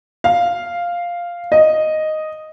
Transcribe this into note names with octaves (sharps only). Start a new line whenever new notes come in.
F5
D#5